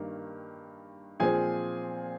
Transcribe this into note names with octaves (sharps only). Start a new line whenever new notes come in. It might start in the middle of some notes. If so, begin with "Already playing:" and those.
Already playing: G2 D#3 A#3
A#2 F3 C4 G#4 G#5